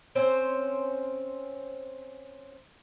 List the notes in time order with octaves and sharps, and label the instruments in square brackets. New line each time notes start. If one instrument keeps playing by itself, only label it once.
[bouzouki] C4 C#4 C5